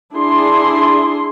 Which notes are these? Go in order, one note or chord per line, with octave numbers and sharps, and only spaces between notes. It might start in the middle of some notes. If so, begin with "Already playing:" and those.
D4 E4 G#4 C6